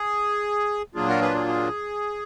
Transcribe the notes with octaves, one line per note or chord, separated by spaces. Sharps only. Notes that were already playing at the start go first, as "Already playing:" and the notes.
Already playing: G#4
A#2 F#3 A#3 D4 F4 G#4
F#4 A#4
G#4 B4
G#4
G#4